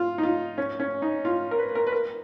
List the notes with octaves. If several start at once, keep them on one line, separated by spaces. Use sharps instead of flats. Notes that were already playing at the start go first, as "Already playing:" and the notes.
Already playing: F4
D#4
F4
C#4
C#4
D#4
F4
A#4
B4
A#4
B4
A#4